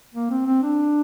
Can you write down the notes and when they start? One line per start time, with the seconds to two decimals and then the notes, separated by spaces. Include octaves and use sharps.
0.14 A#3
0.30 C4
0.46 C4
0.63 D4